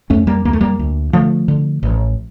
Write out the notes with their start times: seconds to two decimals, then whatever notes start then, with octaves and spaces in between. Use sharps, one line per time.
0.10 F2 A3 C#4
0.27 G3 A#3
0.45 D2 A#3
0.53 A3
0.61 G3 A#3
0.79 D2
1.13 D3 F3 A3
1.48 D3
1.83 A1